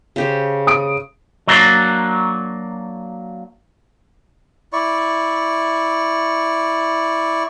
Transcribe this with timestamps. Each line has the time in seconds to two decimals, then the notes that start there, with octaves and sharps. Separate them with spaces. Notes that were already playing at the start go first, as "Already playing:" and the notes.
0.16 C#3 G4 C5
0.67 D#6 D7
1.47 F#3 A#3 D4
4.73 E4 D5 C#6